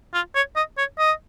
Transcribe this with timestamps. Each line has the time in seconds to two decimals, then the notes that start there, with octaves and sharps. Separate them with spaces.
0.14 F4
0.35 C#5
0.56 D#5
0.78 C#5
0.99 D#5